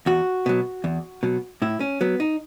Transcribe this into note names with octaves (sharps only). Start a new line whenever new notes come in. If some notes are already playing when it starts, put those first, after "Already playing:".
E2 F#4
B2 F#3
E2
B2 F#3
A2 E4
C#4
F#3 B3
D#4